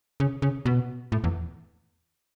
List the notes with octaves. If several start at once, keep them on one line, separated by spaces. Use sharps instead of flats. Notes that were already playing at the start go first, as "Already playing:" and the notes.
C#3
C#3
B2
A2
E2